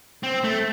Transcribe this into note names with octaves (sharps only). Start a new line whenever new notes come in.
C4
A3